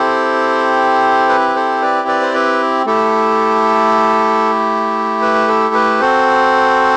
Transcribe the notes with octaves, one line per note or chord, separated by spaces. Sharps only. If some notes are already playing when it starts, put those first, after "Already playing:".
Already playing: C4 E4 G4 A4 C5
B4
A4 C5
B4 D5
B4 D5
C5
B4
A3 E4 G4 A4
B4
A4
B4
C4 F#4 A4 C5